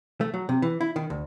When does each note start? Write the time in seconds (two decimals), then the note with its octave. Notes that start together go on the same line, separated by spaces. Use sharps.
0.21 A3
0.34 F#3
0.49 C3
0.62 E3
0.81 E4
0.96 D#3
1.10 D2